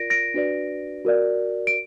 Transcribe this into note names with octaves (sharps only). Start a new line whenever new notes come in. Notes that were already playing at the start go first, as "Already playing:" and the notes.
Already playing: F4 A#4 D5 A#6 D7
A#6 D7
D4 F#4 B4 D5
F#4 A#4 D5
D7